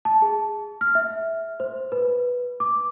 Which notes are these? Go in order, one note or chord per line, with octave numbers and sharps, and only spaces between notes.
A5
G#4
F6
E5
C5
B4
D6